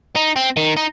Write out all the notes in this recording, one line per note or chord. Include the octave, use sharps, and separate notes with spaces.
D#4
C4
D#3
D#4